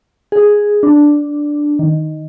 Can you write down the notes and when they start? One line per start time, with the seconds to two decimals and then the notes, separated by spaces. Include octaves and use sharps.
0.32 G#4
0.83 D4
1.79 D#3